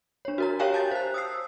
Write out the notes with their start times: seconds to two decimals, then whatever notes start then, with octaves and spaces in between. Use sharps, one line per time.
0.25 D4 C#5
0.38 F#4 A#4 A#5
0.59 G4 C#5 E5 F5 G5 G#5
0.74 A5 G6 A6
0.91 C5 F#6
1.14 D#6 E6 C7